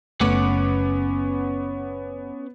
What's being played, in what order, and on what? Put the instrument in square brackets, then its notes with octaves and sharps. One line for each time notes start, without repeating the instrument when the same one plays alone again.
[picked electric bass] F#1 A3 [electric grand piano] B3 D6 C#7 [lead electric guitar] C#4 F#5